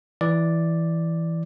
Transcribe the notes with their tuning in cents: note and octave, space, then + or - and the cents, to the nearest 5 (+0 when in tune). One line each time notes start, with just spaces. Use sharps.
E3 +0 D5 +0